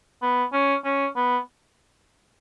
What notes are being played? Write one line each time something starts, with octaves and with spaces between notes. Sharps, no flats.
B3
C#4
C#4
B3